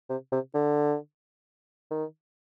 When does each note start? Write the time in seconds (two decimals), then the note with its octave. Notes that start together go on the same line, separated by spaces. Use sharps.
0.09 C3
0.32 C3
0.54 D3
1.91 D#3